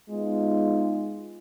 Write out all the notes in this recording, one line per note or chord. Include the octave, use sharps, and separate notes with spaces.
G#3 B3 D#4 F4